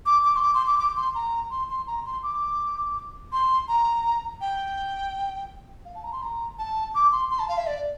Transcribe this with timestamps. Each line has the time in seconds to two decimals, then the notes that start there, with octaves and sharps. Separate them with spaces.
0.06 D6
0.24 D6
0.36 C6
0.43 D6
0.54 C6
0.67 D6
0.79 D6
0.97 C6
1.15 A#5
1.51 C6
1.69 C6
1.87 A#5
2.05 C6
2.23 D6
3.32 C6
3.68 A#5
4.41 G5
5.85 F5
5.95 A5
6.04 A#5
6.13 C6
6.22 A#5
6.59 A5
6.95 D6
7.12 C6
7.31 C6
7.39 A5
7.49 F5
7.57 E5
7.67 D5